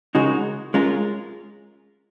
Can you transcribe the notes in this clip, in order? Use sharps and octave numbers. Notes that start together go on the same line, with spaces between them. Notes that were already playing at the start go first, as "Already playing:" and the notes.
C#3 G#3 D#4 F#4 A#4
G#3 C#4 F4 A#4